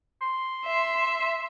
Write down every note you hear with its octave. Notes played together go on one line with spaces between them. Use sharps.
C6
E5